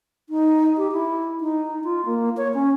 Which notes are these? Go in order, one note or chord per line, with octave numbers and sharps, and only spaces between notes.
D#4
G4
E4
D#4
F4
A#3
C#5
C#4